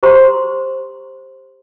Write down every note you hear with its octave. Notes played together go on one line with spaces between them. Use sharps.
G4 C5 A#5 C6